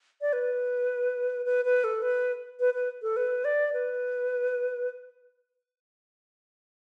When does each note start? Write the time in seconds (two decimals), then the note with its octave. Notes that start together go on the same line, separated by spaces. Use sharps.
0.21 D5
0.33 B4
1.46 B4
1.65 B4
1.84 A4
2.02 B4
2.60 B4
2.74 B4
3.02 A4
3.16 B4
3.45 D5
3.73 B4